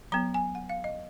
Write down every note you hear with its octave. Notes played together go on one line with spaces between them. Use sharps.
F#3 B3 A#5
G#5
F#5
F5
D#5